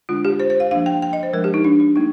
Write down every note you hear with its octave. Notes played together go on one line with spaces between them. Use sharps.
D3 G#3 D4 F4
G4
C5
C5
F5
F3 A#3 D4 F5
G5
G5
D#5
C5
F3 G#3 D4 A#4
G4
D#4
D4
D4
G3 A#3 D#4